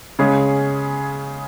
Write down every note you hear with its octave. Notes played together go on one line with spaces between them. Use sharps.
C#3 G#3 C#4 G#4